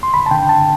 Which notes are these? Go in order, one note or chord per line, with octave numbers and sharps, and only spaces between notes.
C6
D3 B5
A5
D3 G5
D3 A5